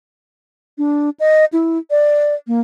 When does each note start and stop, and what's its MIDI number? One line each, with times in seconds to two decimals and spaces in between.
0.78 1.10 62
1.20 1.45 75
1.53 1.78 64
1.91 2.35 74
2.47 2.61 58